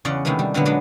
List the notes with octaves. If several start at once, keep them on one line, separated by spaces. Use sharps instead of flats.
E2 C#3 C#4 D5 D#5 F#5
C3 D#3 G#3 A3 B3
G3
A#2 D3 F#3 G#3 B3
F#3 G#3 B3 D4